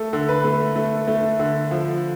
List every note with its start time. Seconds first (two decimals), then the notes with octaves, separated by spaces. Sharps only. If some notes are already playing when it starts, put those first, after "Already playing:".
Already playing: A3 A4
0.13 D3
0.28 B4
0.44 A3
0.76 A3
1.07 A3
1.40 D3
1.71 F3